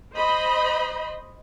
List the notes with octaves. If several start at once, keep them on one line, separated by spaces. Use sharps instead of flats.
C5 D#5 B5